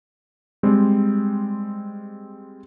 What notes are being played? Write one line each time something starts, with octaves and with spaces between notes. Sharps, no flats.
G3 G#3 C4